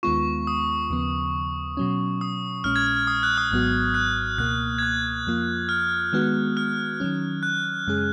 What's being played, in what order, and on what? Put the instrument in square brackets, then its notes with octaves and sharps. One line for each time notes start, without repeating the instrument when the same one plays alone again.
[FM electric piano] D#2 D#3 G#3 B3 F4 [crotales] C#6
[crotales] D#6
[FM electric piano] D#2 C#3 F3 B3
B2 F#3 C#4
[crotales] D#6
[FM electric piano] A#1 A#2 G#3 C#4 [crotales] F6
[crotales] G#6
G#6
F6
D#6
F#6
D#6
[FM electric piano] G#1 G#2 F#3 B3 F#4 [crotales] F#6
[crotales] F#6
[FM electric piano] C#2 B2 A#3 [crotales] F#6
[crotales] G#6
F#6
[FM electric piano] F2 F3 A#3 F4
[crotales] F6
[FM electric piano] D#3 G#3 B3 F#4
[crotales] F6
[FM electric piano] D#3 F#3 C#4
[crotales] F#6
[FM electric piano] F#2 C#3 G#3 C#4 G#4